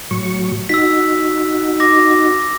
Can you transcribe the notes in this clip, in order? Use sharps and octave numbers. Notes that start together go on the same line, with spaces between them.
A2 F#3 C#6
D#4 F#4 E6 B6
D6 A#6